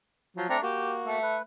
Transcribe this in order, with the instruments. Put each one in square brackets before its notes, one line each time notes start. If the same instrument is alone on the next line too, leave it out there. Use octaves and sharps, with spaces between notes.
[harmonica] F3 F#3
[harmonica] A3 D4 A#5 [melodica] C4
[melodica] A#3 F#4 [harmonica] G4
[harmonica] A3 E5
[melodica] B4